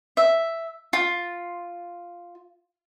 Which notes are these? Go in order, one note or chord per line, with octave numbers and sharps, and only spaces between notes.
E5
F4